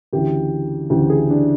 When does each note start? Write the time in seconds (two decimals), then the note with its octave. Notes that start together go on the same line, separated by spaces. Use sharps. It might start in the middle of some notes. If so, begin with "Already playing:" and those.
0.13 D2 C#3 E3 G4
0.90 D2 C#3 E3 G4
1.10 G#4
1.30 D4